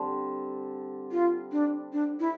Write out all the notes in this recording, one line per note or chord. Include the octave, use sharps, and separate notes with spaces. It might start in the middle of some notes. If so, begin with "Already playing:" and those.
Already playing: D3 G3 C4
F4
D4
D4
E4